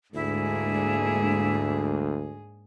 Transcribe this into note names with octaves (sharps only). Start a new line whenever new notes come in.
D2 G#2 G#3 A#3 D4 E4 G#4